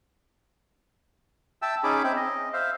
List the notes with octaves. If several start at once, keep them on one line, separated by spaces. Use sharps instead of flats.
E5 G5 A5 E6
C#4 D#4 G#4 B5 D6
C4 E5 G5
D#5
C5 E5 F5